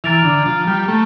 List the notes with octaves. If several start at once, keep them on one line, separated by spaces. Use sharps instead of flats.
E3 A#5 F6 A6 D7 F7
D3
F3
G3
A3